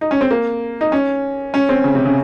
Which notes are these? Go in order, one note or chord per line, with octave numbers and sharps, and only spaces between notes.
D#4
C#4
C4
A#3
D#4
C#4
C#4
C4
C#3
C3
C#3